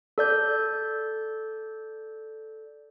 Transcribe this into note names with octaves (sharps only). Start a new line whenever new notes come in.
A4 D5 G6